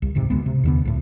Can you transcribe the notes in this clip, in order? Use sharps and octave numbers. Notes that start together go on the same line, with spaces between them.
C2
D#1 G#2 C3
D2 G#3 B3
C3
D#2 D3 B3
C#2 A2